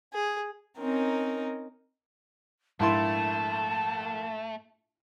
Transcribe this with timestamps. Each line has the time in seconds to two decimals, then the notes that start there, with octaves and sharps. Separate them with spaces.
0.13 G#4
0.78 C4 C#4 D#4 A#4
2.80 A#1 G#2 A3 E4 A5 C6